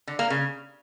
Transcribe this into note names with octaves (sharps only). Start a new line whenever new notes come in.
D3
A#3
C#3